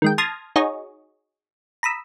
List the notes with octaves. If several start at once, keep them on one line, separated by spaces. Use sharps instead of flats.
D#3 G#3 G5
A5 C6 D#6 F6 G#6 A#6
D#4 F#4 G#4 C#5 D#5
A#5 B5 D#6 E6